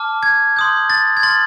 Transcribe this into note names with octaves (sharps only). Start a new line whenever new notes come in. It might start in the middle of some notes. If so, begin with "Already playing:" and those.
Already playing: A5 D6 F6
G#6
C6 D#6 G6
A6
G#6
C6 F6 A6